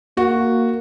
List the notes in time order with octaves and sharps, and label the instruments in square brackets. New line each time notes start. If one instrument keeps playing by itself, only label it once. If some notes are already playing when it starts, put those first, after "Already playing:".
[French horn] A#3 [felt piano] F#4